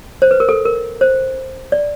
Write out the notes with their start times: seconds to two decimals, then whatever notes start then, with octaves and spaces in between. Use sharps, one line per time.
0.22 C5
0.31 B4
0.40 A#4
0.49 A4
0.65 A#4
1.01 C5
1.72 D5